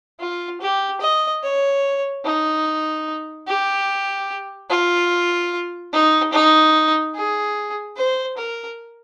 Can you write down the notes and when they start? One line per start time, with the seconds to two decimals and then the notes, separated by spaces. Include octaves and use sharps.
0.20 F4
0.61 G4
1.01 D#5
1.43 C#5
2.25 D#4
3.47 G4
4.70 F4
5.93 D#4
6.32 D#4
7.15 G#4
7.96 C5
8.37 A#4